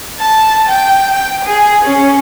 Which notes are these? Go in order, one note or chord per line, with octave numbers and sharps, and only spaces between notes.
A5
G5
G5
G#4
C#4